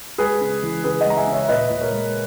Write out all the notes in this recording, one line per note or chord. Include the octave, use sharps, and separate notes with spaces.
G#3 G#4 B4
C#3
E3
C#3 G#4 B4
D#5 F#5
G#3 A#5
E5 G#5
C#3
C#5 E5
E5
A#2 B4 D#5
A#2
A#4 C#5
G#3